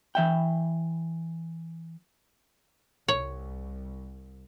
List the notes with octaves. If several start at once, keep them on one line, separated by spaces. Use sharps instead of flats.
E3 E5 G5
C2 C#5